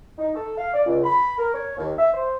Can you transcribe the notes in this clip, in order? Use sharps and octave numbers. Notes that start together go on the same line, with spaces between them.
D#4
A4
F5
D5
C#2
B5
A#4
C#5
D#2
E5
C5